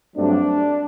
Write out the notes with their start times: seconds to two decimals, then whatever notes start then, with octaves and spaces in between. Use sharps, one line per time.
0.16 G2 F#3 A3 C4 D4